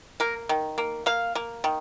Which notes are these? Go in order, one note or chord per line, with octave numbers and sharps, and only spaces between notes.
A#3 A#4
D#3
A#3
A#3 F5
A#3
D#3